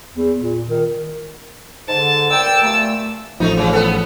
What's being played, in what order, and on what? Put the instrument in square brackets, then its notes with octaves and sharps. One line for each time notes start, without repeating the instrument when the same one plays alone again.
[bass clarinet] E2
A#2
D#3
[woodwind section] G#2 D3 [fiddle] A5
[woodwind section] A#4 D5 G5 [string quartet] E6
[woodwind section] A#2 G3 A3
[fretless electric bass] A1 F3 [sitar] A3 D#4
[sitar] C#3
B3 A4